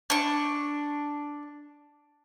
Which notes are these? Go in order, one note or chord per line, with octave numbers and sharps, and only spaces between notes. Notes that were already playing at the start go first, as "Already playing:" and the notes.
D4 C#6